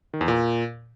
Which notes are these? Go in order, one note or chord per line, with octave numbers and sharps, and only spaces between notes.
D#3
E2
A#2